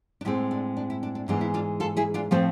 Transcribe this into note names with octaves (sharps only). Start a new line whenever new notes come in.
D4
A2 G#3 C4 E4
D4
D4
E4
D4
D4
G#2 E3 G#3 B3 D4
E4
D4 F4
F4 A4
E4 G#4
D4 F4
A2 F3 A3 C4 A4 C5